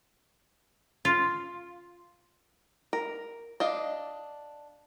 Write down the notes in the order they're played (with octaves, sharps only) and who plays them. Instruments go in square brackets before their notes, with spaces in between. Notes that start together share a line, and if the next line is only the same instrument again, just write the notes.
[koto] F4
[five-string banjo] A#4
D4 D#5 F5